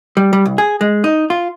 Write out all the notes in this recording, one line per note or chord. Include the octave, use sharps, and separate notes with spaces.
G3
G3
C2
G#4
G#3
D#4
F4